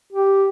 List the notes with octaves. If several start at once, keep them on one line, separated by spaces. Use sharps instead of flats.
G4